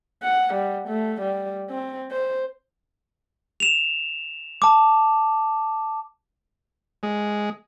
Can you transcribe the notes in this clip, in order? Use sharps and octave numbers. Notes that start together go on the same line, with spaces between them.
F#5
G3
A3
G3
C4
C5
E7 F7
A5 D6
G#3